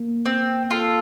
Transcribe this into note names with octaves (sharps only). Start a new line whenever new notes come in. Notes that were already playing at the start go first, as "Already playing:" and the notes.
Already playing: A#3
C4
F4 A4